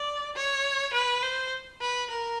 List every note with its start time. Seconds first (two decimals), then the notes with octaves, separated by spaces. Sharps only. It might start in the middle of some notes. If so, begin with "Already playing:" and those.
Already playing: D5
0.35 C#5
0.93 B4
1.23 C5
1.81 B4
2.10 A#4